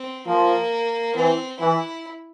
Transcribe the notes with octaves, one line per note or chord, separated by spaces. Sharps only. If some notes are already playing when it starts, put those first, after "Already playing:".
Already playing: C4
F3 A#3
E3 C4
E3 E4